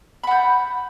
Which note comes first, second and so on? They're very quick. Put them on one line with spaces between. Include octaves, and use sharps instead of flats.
B5 F#5 G6